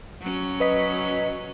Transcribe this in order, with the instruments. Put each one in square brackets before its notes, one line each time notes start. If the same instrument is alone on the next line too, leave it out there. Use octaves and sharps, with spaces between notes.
[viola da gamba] F#3 C#4
[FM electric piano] B4 D#5 B6